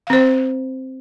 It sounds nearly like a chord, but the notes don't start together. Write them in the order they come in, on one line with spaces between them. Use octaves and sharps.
F5 C4 C5